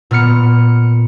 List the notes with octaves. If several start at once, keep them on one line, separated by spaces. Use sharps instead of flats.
A#2 B3 F6 C#7